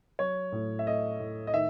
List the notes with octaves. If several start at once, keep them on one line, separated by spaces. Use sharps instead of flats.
F#3 C#5
A2
E5
A3 D#5
A2
D#5
D#3 E5